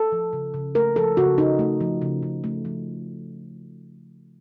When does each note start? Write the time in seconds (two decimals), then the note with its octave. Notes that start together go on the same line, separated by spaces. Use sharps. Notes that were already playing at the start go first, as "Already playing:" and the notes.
Already playing: A4
0.12 F3
0.33 C#3
0.54 C#3
0.75 A3 A#4
0.96 F3 A4
1.17 C#3 F#4
1.38 C#3 D#4
1.59 A3
1.81 F3
2.02 C#3
2.23 C#3
2.44 A3
2.65 F3